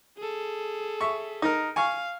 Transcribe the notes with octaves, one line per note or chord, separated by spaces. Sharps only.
G#4 A4
E5 C#6
D#4 A#4
F5 G#5 C#6